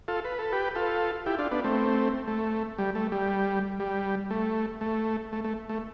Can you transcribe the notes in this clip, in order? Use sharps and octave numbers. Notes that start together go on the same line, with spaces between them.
F4 A4
B4
A4
G4 B4
F4 A4
E4 G4
D4 F4
B3 D4
A3 C4
A3
G3
A3
G3
G3
A3
A3
A3
A3
A3